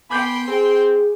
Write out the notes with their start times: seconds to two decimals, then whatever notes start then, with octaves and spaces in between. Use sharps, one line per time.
0.10 B3 G5 G#5 B5 C6 D6 G6
0.48 C4 G#4